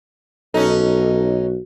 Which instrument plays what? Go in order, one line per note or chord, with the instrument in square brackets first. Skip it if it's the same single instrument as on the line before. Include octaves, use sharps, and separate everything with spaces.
[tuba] B1 [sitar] C#4 D#4 [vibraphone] F#4 [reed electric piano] A4